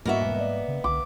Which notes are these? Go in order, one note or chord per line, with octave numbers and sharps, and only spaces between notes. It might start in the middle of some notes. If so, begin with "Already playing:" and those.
G#2 G3 A#3 B3 F#4 D#5 E5
E1
D5 D#5
C#3
C2 D3 D6